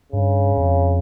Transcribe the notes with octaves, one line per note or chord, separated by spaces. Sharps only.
G2 C#3
F2